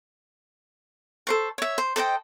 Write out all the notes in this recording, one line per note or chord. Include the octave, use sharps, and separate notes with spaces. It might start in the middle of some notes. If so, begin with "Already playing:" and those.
A4 C5 C#6
C#5 E5
C5
A4 C5 D#5 G5